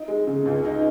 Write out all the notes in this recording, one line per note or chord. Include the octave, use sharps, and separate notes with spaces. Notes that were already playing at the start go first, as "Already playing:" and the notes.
Already playing: D#4
G#3
C#3
C#2
D#4